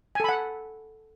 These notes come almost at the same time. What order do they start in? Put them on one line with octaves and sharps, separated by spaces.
G#5 A4 B5 F#5